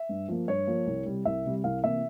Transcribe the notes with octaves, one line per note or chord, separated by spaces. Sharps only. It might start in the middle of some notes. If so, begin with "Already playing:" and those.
Already playing: E5
G2
F3 A#3
G2 C#5
F3 A#3
C2
C3 G3
C2 E5
C3 G3
C2 F5
C3 E3 A#3 E5